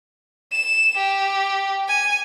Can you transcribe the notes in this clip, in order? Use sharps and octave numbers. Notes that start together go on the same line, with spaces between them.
E7
G4
G#5